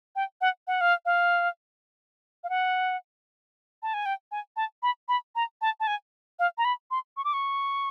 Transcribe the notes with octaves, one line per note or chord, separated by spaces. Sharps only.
G5
F#5
F#5
F5
F5
F5
F#5
A5
G#5
G5
G#5
A5
B5
B5
A#5
A5
A5
G#5
F5
A#5
B5
C6
C#6
D6
C#6